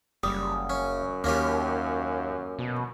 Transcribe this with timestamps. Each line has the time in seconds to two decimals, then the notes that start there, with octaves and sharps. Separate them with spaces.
0.23 F#1 G3 D#6
0.70 F#2 C#4
1.24 D#2 A#3 C#4 G4
2.59 B2